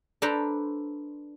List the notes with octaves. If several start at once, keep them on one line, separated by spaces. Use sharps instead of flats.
D4 A4 B4 C5 A#5